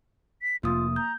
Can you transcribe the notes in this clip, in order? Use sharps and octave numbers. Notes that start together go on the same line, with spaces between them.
B6
F1 F2 A#3 F4 D#6
A#5 G6